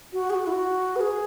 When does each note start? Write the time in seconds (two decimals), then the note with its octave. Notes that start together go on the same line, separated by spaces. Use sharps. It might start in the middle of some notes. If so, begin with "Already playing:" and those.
0.13 F#4
0.30 G#4
0.35 F#4
0.47 E4
0.52 F#4
0.96 B4
1.01 G#4